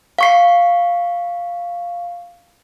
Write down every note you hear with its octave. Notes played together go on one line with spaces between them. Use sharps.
F5 C#6 C7